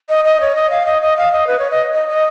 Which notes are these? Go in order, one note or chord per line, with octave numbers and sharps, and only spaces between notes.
D#5
D#5
C#5
D#5
F5
D#5
D#5
F5
D#5
B4
C#5
D#5
D#5
D#5